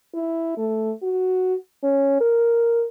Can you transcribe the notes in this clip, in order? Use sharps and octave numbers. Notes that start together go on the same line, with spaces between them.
E4
A3
F#4
C#4
A#4